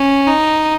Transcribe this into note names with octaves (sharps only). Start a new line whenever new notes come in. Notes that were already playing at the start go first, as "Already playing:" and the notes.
Already playing: C#4
D#4